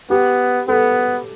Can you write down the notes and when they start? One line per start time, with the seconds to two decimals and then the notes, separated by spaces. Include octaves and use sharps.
0.10 B3 G4
0.68 B3 A4